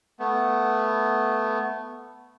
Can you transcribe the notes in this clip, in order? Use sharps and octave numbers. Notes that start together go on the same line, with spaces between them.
A3 B3